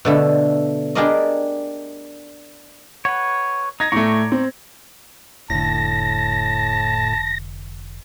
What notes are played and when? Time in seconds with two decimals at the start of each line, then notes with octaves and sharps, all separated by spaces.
0.05 B2 D3 A3
0.95 D4 G4 G#4 A#4 D5 D#5
3.05 B4 C#5 F#5
3.80 D#4 G#6 A#6
3.92 A2 A3 D5 A#5 C#6
4.32 C4
5.50 F1 A2 D3 A5 A#6